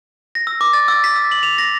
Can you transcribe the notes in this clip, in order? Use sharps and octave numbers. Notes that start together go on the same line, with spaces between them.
A#6
E6
D6
A6
E6
B6
E6
F#7
F7
A#6